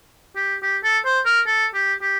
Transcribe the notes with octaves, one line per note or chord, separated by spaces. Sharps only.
G4
G4
A4
C5
A#4
A4
G4
G4